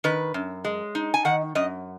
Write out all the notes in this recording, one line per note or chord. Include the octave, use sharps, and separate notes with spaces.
D#3 B4
F#2
G#3
D#4
G#5
D#3 F#5
F#2 D#5